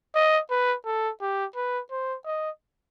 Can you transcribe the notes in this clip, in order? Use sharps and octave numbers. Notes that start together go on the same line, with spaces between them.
D#5
B4
A4
G4
B4
C5
D#5